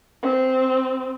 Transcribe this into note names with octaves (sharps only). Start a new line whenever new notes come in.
C4